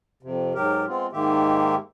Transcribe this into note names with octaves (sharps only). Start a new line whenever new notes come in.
F2 C3
G#2 F#3 G4 A#4
G#3 B3 C4 F4
G#2 D#3 G#3 A#3 G4 E5